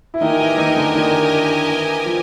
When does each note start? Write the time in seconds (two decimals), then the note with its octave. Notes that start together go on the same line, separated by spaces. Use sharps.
0.14 E4
0.21 D#3 D#4 G4 A#4 D#5 G#5
0.39 E3 E4
0.58 D#3 D#4
0.76 D3 D4
0.95 D#3 D#4
1.68 E3 E4
2.05 F3 F4